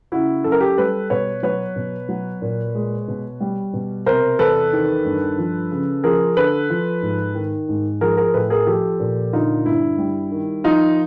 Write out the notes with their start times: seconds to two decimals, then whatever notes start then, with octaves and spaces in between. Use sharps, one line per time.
0.12 C#3 E4 F#4
0.44 F#2 A4
0.52 A#4
0.61 G4 A4
0.77 G3 A4 B4
1.10 B2 B4 C#5
1.43 F#3 B4 C#5
1.76 B2
2.09 F#3
2.42 A#2
2.75 G#3
3.08 B2
3.40 G3
3.73 B2
4.06 C3 A#4 C5
4.39 E2 A4 B4
4.73 D#3
5.05 G2
5.38 F3
5.71 C#3
6.04 F3 G#4 A#4
6.36 D3 A4 B4
6.70 F3
7.02 G#2
7.35 D#3
7.69 G#2
8.01 F3 G#4 A#4
8.17 G#4 A#4
8.33 A2 A4 B4
8.50 G#4 A#4
8.67 F3 G4 A4
9.00 A#2
9.33 D3 D#4 F4
9.65 G2 E4
9.98 G3
10.32 D#3
10.64 F3 D#4 F4